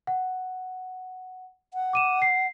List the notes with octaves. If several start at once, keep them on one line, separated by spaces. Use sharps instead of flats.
F#5
F#5
D6 D#7 E7
C7